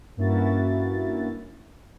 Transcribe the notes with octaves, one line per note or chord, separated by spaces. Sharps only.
G2 A#3 C#4 E4 F#4 A6